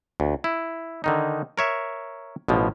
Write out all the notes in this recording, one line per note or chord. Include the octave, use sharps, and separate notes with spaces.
D2
E4
D3 D#3 D#4
A#4 C#5 E5
A1 B2 F3